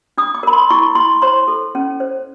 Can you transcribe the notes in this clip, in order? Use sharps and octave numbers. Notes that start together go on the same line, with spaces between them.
D4 D#6
D6
A#4 B5
C6
E4 C#6
E4 C6
C5 C6
A4
C#4
C5